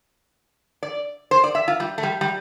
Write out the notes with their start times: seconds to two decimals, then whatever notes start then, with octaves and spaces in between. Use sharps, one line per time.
0.83 D5
1.31 C5
1.44 D5
1.55 E5
1.68 F4
1.80 G3
1.98 A3
2.03 G3
2.21 G3